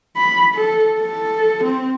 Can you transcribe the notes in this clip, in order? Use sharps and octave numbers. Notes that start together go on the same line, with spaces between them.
B5
A4
A4
C4